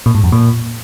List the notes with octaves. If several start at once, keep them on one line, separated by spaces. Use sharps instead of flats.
A#2
G#2
F2
A#2